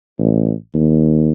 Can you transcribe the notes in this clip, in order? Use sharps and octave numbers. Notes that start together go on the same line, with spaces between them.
A1
D#2